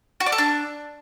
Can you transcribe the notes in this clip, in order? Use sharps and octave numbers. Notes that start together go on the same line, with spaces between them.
F#4
D5
A4
D4